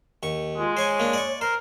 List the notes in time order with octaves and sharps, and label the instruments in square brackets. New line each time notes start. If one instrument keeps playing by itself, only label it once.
[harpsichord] D#2 C#6
[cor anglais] G#3 [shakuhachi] F4
[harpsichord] C5 G#5 C#6 [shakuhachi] C#5
[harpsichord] A#3 D4
D5 C#6
[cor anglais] A#4 [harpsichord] C5